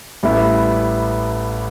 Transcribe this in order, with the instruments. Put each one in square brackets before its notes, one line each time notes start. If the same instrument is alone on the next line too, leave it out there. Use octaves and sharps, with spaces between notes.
[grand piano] A1 A2 G3 B3 E4